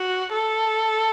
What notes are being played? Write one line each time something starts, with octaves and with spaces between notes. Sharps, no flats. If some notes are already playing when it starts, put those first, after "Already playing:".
Already playing: F#4
A4